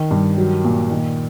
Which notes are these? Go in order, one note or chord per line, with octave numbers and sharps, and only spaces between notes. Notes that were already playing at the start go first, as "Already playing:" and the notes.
Already playing: D#3
G2
F#3
A#2
D#3